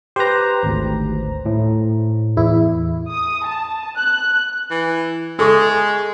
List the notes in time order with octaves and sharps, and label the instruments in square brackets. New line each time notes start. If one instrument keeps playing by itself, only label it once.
[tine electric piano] G4 B4 [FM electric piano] C5 A#5
[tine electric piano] G#1 D2
A2
[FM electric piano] E2 E4
[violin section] D#6
A5
F#6
[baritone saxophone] E3
[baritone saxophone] G#3 [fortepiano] A4 C#6 D#6